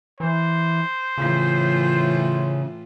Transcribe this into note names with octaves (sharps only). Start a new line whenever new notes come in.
E3 C5
A2 C#3 E3 F4